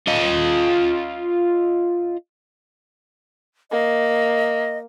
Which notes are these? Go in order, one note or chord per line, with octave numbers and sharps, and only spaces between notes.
F4 D#5
A#3 D#5